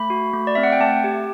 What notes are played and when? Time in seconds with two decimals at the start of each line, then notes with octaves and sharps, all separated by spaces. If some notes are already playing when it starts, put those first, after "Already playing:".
Already playing: A3 B5
0.10 F#4
0.33 A3
0.47 D5
0.55 C4 E5
0.63 F#5
0.72 G5
0.80 A3 A5
1.04 G4